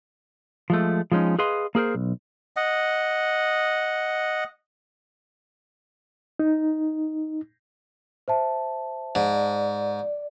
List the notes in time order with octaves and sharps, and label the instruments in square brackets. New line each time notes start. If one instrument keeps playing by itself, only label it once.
[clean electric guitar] F3 G#3 A3
F3 G#3 C#4 D#4
G#4 B4 D#5 F5 C6
A#3 G#4 A#4 C5
B1
[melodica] D#5 F#5
[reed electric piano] D#4
[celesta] C5 E5 A5
[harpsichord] G#2 [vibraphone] D5